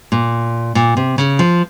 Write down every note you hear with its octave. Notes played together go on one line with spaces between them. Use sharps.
A#2
A#2
C3
C#3
F3